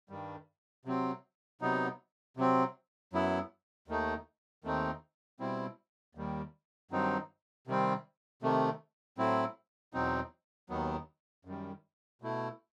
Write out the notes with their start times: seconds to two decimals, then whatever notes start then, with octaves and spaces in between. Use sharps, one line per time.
0.09 G2 D#3 G3
0.85 C3 F#3 C4
1.61 C3 F#3 B3 D#4
2.37 C3 F#3 C4
3.13 F#2 F#3 B3 E4
3.88 D#2 D#3 A3 D#4
4.64 D#2 D#3 A3 C4 D#4
5.40 B2 G3 C4 E4
6.15 D#2 D#3 G3
6.91 G2 D#3 F#3 C4 D#4
7.67 C3 D#3 G3 C4
8.42 C3 D#3 A3
9.18 A2 F#3 C4 E4
9.93 E2 B2 F#3 C4 D#4
10.69 D#2 D#3 F#3 B3
11.45 F#2 D#3 G3
12.22 B2 A3 E4